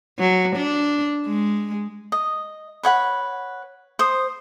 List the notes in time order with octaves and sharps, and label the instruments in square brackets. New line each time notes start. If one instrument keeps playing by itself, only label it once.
[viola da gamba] F#3
D4
G#3
[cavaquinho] D#5
B4 C#5 F#5 B5
C5 D#6